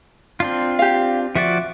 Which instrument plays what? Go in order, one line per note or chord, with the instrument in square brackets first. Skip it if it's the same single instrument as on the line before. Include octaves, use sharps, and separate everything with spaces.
[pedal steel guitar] C4 D4 F4
[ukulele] G4 F5
[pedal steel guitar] F3 F#4 D5 [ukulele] E5